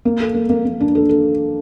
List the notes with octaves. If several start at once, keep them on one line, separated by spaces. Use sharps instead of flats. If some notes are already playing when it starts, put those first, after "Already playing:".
A#3
A4
A#3
A#3
A#3
D4
A4
A4